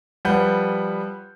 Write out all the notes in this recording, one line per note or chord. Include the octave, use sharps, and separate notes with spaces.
F3 G3 B4 F#5 G6